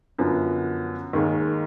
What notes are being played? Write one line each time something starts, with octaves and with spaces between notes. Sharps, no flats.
F#2 D3 F3 B3
D#2 D#3 G#3